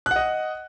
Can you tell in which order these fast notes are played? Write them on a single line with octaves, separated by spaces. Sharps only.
F#6 F#5 D#5